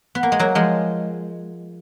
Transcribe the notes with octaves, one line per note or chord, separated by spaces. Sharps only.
B3
A#3
G#3
F#3 A#3
F3 G#3